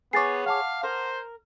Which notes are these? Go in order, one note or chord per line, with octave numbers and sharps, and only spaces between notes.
B3 G#4 C#5 D6 A6 C7
F5 F#5 A5 D6
A#4 C5